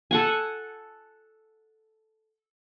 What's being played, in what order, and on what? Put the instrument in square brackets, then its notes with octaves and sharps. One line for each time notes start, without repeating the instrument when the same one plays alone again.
[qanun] A4 F#5 G#5